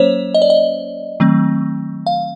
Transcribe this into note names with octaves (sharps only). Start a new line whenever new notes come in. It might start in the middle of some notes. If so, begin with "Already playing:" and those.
Already playing: F#3 A#3 C#4 C5 C#5
D#5
D5
D#5
D#3 F#3 A3 C4
F5